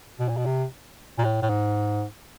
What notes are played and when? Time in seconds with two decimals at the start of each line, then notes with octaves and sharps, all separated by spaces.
0.20 B2
0.29 A#2
0.37 B2
0.46 C3
1.18 A#2
1.24 A2
1.42 A2
1.49 G#2